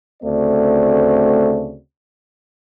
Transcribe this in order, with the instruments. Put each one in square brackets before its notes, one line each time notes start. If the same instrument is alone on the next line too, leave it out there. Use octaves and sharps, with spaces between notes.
[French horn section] D2 C#3 A3 C4 F#4 D5